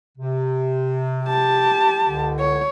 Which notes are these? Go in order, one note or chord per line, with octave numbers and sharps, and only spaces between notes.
C3
G4 A5
C#2 D3
C#5